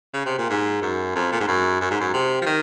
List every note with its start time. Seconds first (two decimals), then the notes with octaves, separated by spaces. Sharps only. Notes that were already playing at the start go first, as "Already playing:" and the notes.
0.14 C#3
0.26 C3
0.38 A#2
0.50 G#2
0.82 F#2
1.16 F2
1.32 A#2
1.41 G#2
1.48 F#2
1.81 F#2
1.91 G#2
2.01 F#2
2.14 C3
2.42 F3
2.46 D#3